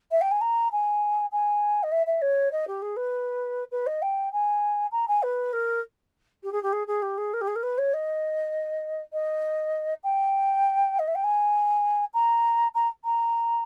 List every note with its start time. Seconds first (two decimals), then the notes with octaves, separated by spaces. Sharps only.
0.11 E5
0.21 G5
0.31 G#5
0.41 A#5
0.72 G#5
1.32 G#5
1.83 D#5
1.92 E5
2.07 E5
2.22 C#5
2.52 D#5
2.68 G4
2.82 G#4
2.97 B4
3.72 B4
3.87 D#5
4.02 G5
4.33 G#5
4.92 A#5
5.08 G#5
5.23 B4
5.53 A#4
6.43 G4
6.52 G#4
6.63 G4
6.73 G#4
6.87 G#4
7.02 G4
7.18 G#4
7.34 A#4
7.41 G4
7.48 G#4
7.56 A#4
7.63 B4
7.78 C#5
7.94 D#5
9.13 D#5
10.04 G5
10.99 D#5
11.08 E5
11.15 G5
11.24 G#5
12.14 A#5
12.75 A#5
13.05 A#5